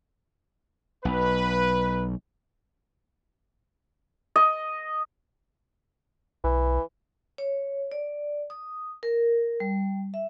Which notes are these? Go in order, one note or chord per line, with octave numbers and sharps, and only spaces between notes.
B1 B4
D#5
B1 E3
C#5
D5
D#6
A#4
G3
E5